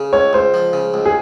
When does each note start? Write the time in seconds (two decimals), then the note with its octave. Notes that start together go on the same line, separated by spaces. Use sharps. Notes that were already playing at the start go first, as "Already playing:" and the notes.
Already playing: C#3
0.13 C#2 C#5
0.33 C#2 C5
0.54 F3
0.73 C#3
0.94 C#2
1.06 G#4